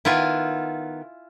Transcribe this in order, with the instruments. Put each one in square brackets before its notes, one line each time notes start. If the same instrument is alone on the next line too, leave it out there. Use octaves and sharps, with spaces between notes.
[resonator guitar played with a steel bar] D#3 B3 [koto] E4 F4 G#5